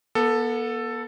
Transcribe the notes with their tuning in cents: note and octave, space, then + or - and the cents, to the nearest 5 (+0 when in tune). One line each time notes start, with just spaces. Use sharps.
B3 -40 A4 +5